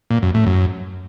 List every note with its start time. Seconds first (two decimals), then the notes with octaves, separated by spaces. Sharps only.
0.11 A#2
0.22 F#2
0.34 A2
0.46 F#2